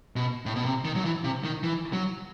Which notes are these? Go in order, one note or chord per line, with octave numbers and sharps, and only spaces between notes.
B2
A2
B2
C3
D#3
F#3
E3
C3
D#3
E3
F#3